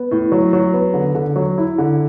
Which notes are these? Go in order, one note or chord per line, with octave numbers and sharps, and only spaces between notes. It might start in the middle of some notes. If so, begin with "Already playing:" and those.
Already playing: B3
A2
F#3
F#3
B3
D3
D3
F#3
E4
D3